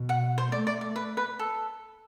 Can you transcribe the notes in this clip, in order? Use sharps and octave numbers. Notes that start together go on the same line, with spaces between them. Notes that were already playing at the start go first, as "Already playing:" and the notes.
Already playing: B2
F#5
C5
A3 D5
D5
D5
B4
B4
A4